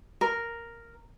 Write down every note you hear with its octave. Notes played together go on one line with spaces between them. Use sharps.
A#4